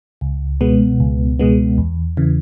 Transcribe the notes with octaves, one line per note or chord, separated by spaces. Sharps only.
C#2
B2 G#3 B3
C#2
B2 G#3 B3
E2
C#3 E3